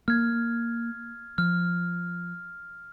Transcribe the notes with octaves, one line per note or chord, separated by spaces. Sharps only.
A#3 F6 G#6
F3 F6